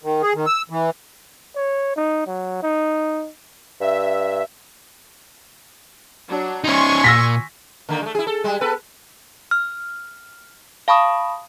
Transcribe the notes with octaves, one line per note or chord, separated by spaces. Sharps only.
D#3
G#4
D#3
E6
E3
C#5
D#4
F#3
D#4
G2 E5
F#3 D4
C#4 D#4 G#5 C6 C#6
A#2 E6 A#6 B6
D3 D#3 A#3
G#3 A3
E4 G#4
A4
G3 G#3
B3 A4 B4
F6
F5 A5 B5 C#6 D#6